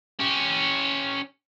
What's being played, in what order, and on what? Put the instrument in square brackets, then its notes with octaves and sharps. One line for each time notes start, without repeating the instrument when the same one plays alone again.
[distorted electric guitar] C#4 G4